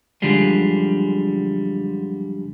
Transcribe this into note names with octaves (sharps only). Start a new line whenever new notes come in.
F#2 D3 F3 G3 G#3